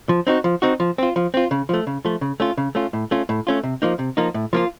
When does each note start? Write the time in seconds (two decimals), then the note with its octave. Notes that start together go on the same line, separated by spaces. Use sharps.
0.09 F3
0.27 C4 D#4 F#4
0.44 F3
0.62 C4 D#4 F#4
0.80 F3
0.98 C4 F4
1.16 F3
1.34 C4 F4
1.51 C#3
1.69 F3 A3
1.87 C#3
2.05 F3 A3
2.21 C#3
2.40 A3 C#4 F4
2.57 C#3
2.75 A3 C#4 F4
2.93 A2
3.11 A3 C#4 F4
3.29 A2
3.47 A3 C#4 F4
3.63 C3
3.82 F3 A#3 D#4
3.99 C3
4.17 F3 A#3 D#4
4.34 A2
4.53 F3 A#3 F4